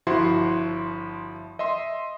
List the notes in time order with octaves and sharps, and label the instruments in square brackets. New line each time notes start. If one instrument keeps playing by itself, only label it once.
[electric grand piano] G1 F3 E4 F#4 C6
D#5 E5 C6